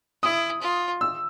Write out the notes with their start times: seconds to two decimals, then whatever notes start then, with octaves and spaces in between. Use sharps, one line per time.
0.23 E4 D#6
0.62 F4
1.01 E6